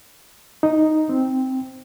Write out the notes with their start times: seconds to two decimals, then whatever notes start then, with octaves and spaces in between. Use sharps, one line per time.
0.63 D#4
1.09 C4